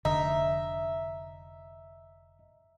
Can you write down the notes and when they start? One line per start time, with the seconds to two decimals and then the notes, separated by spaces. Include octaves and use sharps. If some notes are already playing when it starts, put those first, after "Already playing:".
0.05 F1 D3 D#5 E5 A#5